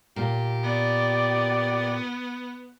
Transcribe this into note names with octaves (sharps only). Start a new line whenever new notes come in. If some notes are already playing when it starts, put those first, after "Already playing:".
A#2 G4
B3 D5